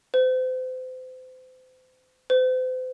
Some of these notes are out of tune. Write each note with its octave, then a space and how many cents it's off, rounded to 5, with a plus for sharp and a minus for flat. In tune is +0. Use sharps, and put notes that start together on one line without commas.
C5 -35
C5 -40